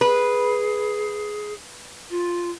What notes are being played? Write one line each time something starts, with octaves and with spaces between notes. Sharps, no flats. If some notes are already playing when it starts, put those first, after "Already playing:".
G#4 B4
F4